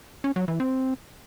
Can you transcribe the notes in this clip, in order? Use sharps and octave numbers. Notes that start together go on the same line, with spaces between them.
C#4
F#3
E3
C4